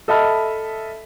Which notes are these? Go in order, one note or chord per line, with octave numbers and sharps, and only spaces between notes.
A4 D#5 E5 A5 B5 F6